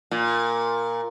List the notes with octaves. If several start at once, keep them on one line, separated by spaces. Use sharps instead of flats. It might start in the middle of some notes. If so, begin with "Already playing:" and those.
A#2